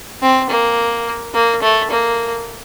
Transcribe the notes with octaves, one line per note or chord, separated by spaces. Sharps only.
C4
A#3
A#3
A3
A#3